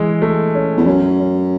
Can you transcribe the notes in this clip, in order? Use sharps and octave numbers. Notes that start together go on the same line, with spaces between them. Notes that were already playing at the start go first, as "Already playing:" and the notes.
Already playing: E3 G#3
A3
C#4
E2
F#2 C#4
C#4